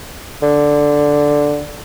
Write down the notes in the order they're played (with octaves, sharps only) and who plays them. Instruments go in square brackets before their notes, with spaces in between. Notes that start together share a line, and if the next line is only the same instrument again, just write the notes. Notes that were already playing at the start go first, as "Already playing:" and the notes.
[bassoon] D3